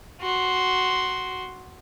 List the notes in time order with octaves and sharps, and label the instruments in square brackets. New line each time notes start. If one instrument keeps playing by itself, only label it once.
[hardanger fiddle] F#4 C6